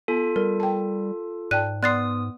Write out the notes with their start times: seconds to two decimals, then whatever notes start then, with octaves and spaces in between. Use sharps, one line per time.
0.08 B3 F4 A4
0.36 G3 A#4
0.60 G5 A5
1.51 G#2 D5 G5 A5 F#6 D#7
1.83 B3 D5 C6 D#6 F#6 A6 C7